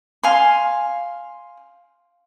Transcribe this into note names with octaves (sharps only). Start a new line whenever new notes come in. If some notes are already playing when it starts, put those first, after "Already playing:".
F5 G#5 C6